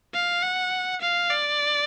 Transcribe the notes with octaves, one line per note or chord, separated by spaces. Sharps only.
F5
F#5
F5
D5